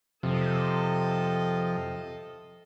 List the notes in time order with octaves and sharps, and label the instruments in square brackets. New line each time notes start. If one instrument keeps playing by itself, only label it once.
[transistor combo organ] F2 F3 [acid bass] C3 [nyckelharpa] A4 D#5